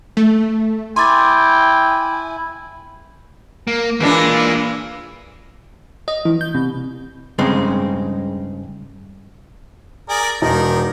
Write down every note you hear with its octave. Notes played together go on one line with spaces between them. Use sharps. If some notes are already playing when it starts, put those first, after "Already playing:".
A3
E4 G5 G#5 C6 D6 A6
A#3
E3 G#3 A#3 D4 F4
D#5
E3
G6
C3
G2 C#3 G#3 C4 D#4
G#4 A#4 D5
E1 D#3 D#4 A#4